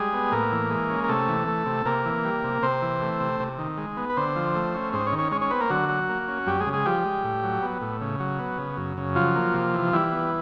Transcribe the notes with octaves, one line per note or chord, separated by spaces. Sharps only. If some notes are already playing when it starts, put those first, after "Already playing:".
Already playing: G3 G#3 G#4
B3
A2 A#3 A#4
E3
G#3
C#4
A#4
C3 A3 A4
E3
A3
C3
C3 A#3 A#4
E3
G3
C3
C3 C4 C5
E3
A3
C3
C3
D#3
G#3
B3
B4
D3 C4 C5
F3
A3
C#4
G#2 C4 C5
C#4 C#5
D#3
C#4 C#5
G#3 C#4 C#5
C#4 C#5
B3 C4 B4
A#3 A#4
D3 F#3 F#4
F#3
A#3
C#4
F#2 G3 G4
G#3 G#4
C#3
G#3 G#4
F3 G3 G4
G#3
A2
F#3
B3
A2
C#3
F#3
B3
C#3
F#2
C#3
F3 F#3 F4
A#3
C3
E3
E3 G3 E4
B3